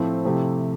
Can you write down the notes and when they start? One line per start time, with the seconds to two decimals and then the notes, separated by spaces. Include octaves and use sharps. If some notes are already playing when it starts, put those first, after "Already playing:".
Already playing: A2 F3 A3 C4 E4
0.25 C3 F3 A3 E4 G4